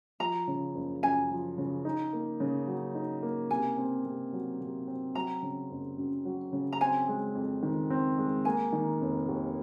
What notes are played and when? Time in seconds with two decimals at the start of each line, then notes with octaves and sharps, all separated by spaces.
0.20 F3 A#5
0.48 C#3
0.75 F#1
1.03 F#2 G#5
1.30 F3
1.58 C#3
1.85 D#4
2.13 A#3
2.40 C#3
2.67 F#3
2.95 D#4
3.22 A#3
3.51 C3 G#5
3.78 C4
4.06 C3
4.33 F#3
4.61 C3
4.87 C4
5.15 F#3 A#5
5.42 C#3
5.70 F#1
5.98 F#2
6.25 F#3
6.53 C#3
6.73 A#5
6.81 C4 G#5
7.08 G#3
7.35 F2
7.63 D#3
7.90 C4
8.18 G#3
8.45 A#3 G#5
8.73 D#3
9.01 F1
9.28 D#2